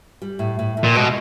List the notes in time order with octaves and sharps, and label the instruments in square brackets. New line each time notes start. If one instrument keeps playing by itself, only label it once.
[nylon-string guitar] G3
A2
A2
A2
[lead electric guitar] A#2
[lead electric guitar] B2 [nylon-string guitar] G#3